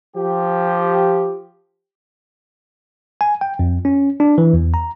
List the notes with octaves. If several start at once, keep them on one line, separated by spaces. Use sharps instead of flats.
F3 G4
G#5
G5
F2
C#4
D4
E3
E2
A#5